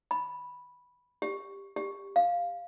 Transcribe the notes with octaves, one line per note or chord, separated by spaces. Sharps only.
B5
G4
G4
F5